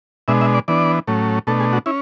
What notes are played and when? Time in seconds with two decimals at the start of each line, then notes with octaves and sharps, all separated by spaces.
0.28 B2 G#3 D4 E5
0.41 E5
0.54 D5
0.68 E3 B3 D4 D5
1.07 A2 F#3 A3 C#4
1.47 B2 A3 D4 A4
1.60 G#4
1.73 F#4
1.86 C#4 E4